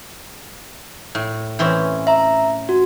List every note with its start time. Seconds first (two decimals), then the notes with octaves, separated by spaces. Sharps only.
1.15 A2
1.59 E3 C4 C#4
2.07 E5 A#5
2.69 F#4